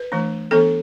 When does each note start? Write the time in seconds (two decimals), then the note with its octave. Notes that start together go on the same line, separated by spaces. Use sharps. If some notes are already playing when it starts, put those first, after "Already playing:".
Already playing: B4
0.12 E3 A3 D4
0.51 E3 B3 D4 A4